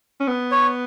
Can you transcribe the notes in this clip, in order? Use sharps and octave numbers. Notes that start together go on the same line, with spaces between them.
C#4
B3
C#5